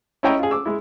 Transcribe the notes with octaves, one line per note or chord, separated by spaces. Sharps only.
C#4 E4 C#5 D#5 G5 A#5
F4 G#4
D6 E6
G#3 E4